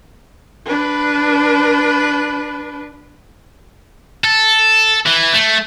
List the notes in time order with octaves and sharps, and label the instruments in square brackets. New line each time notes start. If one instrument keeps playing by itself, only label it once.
[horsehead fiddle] D4 B4
[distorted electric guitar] A4
E3
A3